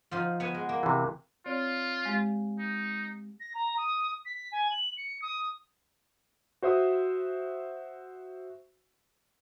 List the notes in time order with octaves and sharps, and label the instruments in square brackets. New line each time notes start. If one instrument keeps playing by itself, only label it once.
[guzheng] F3 D#4 F4
B3 F#5 G#5
G#3
A#3
[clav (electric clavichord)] C3 E3
[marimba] C4 C#5 D5 [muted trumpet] F4
[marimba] G#3 G4 F5
[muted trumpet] D#4
[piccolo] A#6
A#5
D#6
B6
G#5
F#7
C#7
D#6
[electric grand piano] F#4 C5 E5 D#6